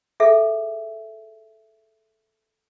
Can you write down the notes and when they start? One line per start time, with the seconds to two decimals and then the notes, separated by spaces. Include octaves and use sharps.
0.20 G#4 A4 E5